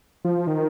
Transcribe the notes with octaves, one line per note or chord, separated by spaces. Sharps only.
F3
D#3